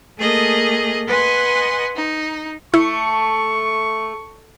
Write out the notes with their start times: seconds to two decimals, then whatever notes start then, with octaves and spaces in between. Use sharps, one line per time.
0.19 A3 A#3 G#4 D#5
1.07 B4 D#5 F#5 G#5 C6
1.95 D#4
2.74 A3 E4 C#6